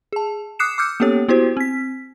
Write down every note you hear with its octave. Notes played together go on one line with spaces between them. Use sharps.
G#4 A5
D6 D#6 F#6 C7 C#7 E7
D6 E6 F6 G6 C#7
A#3 B3 C#4 G4 A4 C#5
B3 E4 F#4 G4 C5
C4 B6